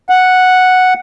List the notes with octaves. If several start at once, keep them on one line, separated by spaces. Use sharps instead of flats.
F#5